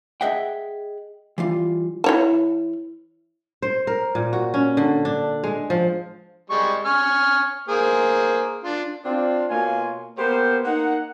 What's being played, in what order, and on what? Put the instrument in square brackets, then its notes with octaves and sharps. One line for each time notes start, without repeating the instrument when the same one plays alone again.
[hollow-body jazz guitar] G#4 D#5 E5 F#5 G5
E3 G3 F4
[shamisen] E3 C#5 A5
[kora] C5
A#4
A#2
F#4
C#4
D3
D4
G#3
F3
[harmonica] G3 G#3 C#6
G#5 C#6 F6
A#3 G#4 C5
D4 F4
[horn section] C4 D4 F4
B2 A#3 F4 C#5 G#5
A#3 B3 G4 A#4 C5
A#3 D#4 A#4 F#5